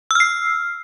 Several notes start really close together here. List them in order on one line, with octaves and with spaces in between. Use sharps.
E6 F6 C7